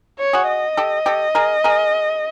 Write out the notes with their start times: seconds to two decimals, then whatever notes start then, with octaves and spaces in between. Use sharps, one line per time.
0.19 C#5
0.33 F#4 G#4
0.48 D#5
0.77 G4 A4
1.06 G4 A4
1.35 G#4 A#4
1.64 G#4 A#4